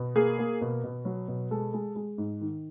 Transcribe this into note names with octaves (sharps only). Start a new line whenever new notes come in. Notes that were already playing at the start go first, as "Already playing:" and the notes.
Already playing: B2
A#3 G#4
A#3
B2
B2
F#3
B2
G#3 A4
G#3
G#3
G#2
D#3